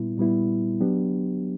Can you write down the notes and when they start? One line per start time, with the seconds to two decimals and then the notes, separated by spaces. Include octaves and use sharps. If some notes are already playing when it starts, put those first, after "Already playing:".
Already playing: A#2 G3 B3 E4
0.18 A#2 G3 B3 E4
0.81 F#3 B3 D4 G4